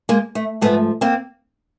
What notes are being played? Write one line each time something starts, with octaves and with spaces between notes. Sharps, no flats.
G#3 A#3
A3
G#2 F3 A3 B3
A#3 C4